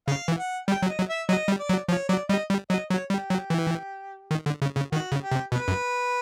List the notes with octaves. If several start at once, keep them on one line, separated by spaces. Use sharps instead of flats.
C#3 F5
E3
F#5
G3 G5
F#3
D#5
F#3
E5
F#3 D#5
G3
D5
F#3
F3 C#5
F#3 D5
G3 D#5
G3
F#3 D#5
F#3 C#5
G3 G4
F#3
E3
D#3
D3
C#3
C#3
D#3 F#4
C#3
G4
C3
B2 B4
F#2